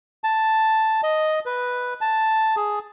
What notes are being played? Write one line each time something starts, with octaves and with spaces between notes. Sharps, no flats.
A5
D#5
B4
A5
G#4